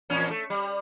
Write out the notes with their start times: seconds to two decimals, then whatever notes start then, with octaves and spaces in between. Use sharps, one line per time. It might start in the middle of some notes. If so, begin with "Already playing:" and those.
0.10 E2 A#2 C#4
0.30 A3
0.50 G3